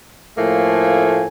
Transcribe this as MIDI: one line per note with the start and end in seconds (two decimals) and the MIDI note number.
0.38 1.28 45
0.38 1.28 53
0.38 1.28 57
0.38 1.28 58
0.38 1.28 80